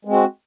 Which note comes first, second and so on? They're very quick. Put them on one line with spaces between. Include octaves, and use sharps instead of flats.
G#3 C4 F#4